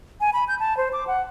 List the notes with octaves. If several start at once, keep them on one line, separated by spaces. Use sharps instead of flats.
G#5
B5
G6
A5
C5
D6
F#5